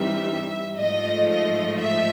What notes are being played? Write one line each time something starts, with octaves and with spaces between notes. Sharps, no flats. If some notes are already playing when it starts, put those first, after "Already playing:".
Already playing: G2 E3 G3 C4 D#4 E5
G#2 F3 A3 D#5
D#5
E5